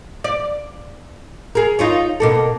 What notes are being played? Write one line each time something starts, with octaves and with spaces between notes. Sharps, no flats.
D5
G#4 A#4
D#4 F4 C#5
B2 A#3 A4